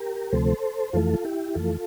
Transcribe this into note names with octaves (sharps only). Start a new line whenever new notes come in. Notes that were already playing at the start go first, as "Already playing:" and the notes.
Already playing: G4 A#4
D2 C3 F3 A3 A4 C5
F2 E3 A3 F4 A4
F4
E4 G4
F2 E3 A3 F4 A4